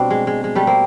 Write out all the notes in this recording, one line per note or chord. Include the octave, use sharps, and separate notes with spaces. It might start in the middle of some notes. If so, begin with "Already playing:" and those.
Already playing: B2 G3 C4 D4
G#3
G#3
G#3
G3 A3
A#3 C4